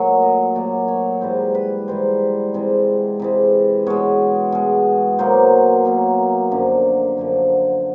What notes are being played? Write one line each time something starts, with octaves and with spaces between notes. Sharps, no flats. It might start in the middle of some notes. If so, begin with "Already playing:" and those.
Already playing: A#2 F#3 A3
D#5
A#2 F#3 A3 D5
C#5
G#2 E3 G3 C5
B4
G#2 E3 G3 C5
C3 E3 G#3
C3 E3 G#3
B2 G#3 C#5
B2 G#3
B2 F#3 A#3 C5
B2 F#3 A#3
F#2 D3 F3
F#2 D3 F3